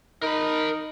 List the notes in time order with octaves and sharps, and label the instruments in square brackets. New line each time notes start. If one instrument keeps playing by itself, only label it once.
[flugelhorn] D#4 [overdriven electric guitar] A#4 B5